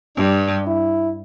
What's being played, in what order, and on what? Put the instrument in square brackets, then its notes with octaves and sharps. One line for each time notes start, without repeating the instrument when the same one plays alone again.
[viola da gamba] G2 [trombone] D4
[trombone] E4